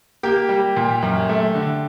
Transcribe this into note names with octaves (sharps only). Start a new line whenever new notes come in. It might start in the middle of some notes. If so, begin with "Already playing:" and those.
A#3 G4 G5
G3
A#2
F#2
A3
D3